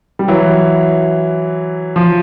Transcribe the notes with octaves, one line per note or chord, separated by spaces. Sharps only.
G3
E3 F#3
F3